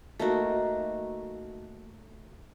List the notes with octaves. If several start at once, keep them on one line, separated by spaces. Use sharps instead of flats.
A3 A#3 D#4 F#4